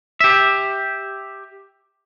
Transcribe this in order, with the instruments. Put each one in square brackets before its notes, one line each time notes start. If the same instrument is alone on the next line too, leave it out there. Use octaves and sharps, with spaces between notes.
[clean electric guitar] G4 E5